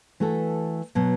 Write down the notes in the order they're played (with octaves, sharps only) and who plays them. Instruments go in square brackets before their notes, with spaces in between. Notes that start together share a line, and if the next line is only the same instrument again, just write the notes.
[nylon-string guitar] E3 A3 F#4 A4
B2 F#3